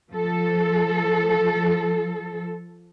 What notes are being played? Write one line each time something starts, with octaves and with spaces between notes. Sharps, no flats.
F3 A4